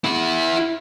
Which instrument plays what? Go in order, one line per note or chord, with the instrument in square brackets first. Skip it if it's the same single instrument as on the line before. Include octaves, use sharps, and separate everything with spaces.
[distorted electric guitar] E4 F#5